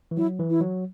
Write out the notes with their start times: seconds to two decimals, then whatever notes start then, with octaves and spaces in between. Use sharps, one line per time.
0.11 E3
0.17 F#3 E4
0.39 E3
0.50 E4
0.61 F#3